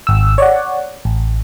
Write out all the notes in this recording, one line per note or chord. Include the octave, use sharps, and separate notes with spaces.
G#1 E6
C#5 D5 F#5
A1